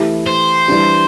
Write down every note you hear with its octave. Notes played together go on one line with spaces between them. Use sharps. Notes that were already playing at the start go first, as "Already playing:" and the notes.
Already playing: E3 A3 E4 G4
C5
E3 G3 D4 G4